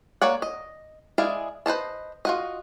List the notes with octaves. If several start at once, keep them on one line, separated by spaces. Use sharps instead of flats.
A#3 C#5 D5 F#5
D#5
G#3 E4 G#4 D5 F5
B4 C5 D#5 A5
F4 F#4 D#5